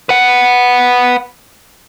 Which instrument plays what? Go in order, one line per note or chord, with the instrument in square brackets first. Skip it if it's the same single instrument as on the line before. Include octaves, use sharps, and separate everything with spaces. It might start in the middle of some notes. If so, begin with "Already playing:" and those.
[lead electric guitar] B4 F#5